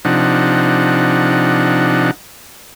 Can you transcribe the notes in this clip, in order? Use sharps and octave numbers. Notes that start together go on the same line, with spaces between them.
C3 F3 D4 D#4 F#5